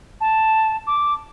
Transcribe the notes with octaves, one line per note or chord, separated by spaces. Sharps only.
A5
D6